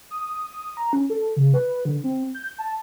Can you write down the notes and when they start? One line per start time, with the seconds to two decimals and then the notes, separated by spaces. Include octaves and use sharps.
0.11 D#6
0.52 D#6
0.77 A#5
0.93 C#4
1.10 A4
1.36 C#3
1.54 B4
1.85 D3
2.04 C4
2.34 G6
2.59 A5